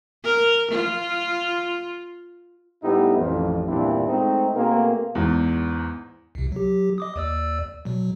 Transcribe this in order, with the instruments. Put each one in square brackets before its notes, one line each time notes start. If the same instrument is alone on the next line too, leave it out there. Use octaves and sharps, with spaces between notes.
[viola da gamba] A#4
F4
[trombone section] A2 G3 B3 D#4 E4 G4
A1 F2 F3
E2 G2 A#2 C4 D4 E4
G#3 A3 C4 D#4
B2 A3 A#3 C4 G#4 A#4
[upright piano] E2 G#2
[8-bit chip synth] C2 C3
F#3 G4
D#5 D6 D#6
D#2 D5 E6
B2 F#3